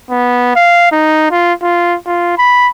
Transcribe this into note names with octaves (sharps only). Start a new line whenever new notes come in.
B3
F5
D#4
F4
F4
F4
B5